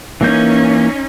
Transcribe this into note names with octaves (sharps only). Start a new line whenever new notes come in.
E3 A#3 C#4 D#4 G6